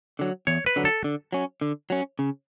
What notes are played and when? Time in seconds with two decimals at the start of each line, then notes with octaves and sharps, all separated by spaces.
0.19 D3 F#3
0.47 E2 C#5
0.66 B4
0.76 D3 F#3
0.85 A4
1.04 D3
1.33 F#3 C#4
1.61 D3
1.90 F#3 C#4
2.19 C#3